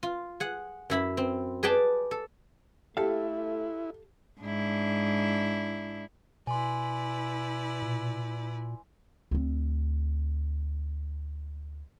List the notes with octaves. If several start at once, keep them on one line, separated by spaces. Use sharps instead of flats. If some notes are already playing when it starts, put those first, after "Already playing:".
F4
G#4 F#5
F#2 E4 B5
C4
G#4 B4 D5 G5 A5
A4
A3 E4 G4 A4 F5
G#2 D4 E4
B2 E4 B4 D5 G#5 C6
A#2
D2 C4